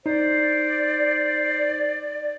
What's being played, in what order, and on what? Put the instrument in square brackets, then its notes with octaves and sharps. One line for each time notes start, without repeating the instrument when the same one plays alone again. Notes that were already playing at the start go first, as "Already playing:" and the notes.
[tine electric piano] D#4 [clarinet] C5 [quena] D5